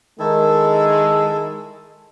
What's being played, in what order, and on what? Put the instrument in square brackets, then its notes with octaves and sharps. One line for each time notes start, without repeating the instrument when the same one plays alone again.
[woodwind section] D#3 [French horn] G#3 [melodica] E4 A4